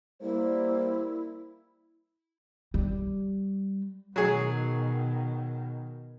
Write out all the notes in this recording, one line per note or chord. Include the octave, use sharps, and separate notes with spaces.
G3 A#3 E4 C5
G3
B2 D#3 F#3 G#4